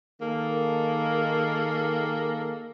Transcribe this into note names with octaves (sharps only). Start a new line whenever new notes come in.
D#3 A#3 G#4 A4